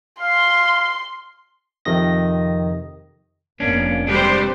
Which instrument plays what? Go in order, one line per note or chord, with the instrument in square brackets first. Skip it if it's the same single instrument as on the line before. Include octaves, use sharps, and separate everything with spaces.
[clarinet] F5 [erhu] C6
[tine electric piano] F2 C3 D#3 D#5 A#6
[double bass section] F1 A#3 B3 [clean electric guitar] C#4 D4
[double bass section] C3 [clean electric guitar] G3 G#3 D4 [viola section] G4 B4 C5